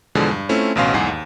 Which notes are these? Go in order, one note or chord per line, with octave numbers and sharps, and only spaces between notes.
E2 B2 D3 F3 G#3
G2
A3 C4 C#4 E4 F4
A1 D2 B2 C#4 F5 C6
B1 E2 G#2 F#5 G#5 C7
D#2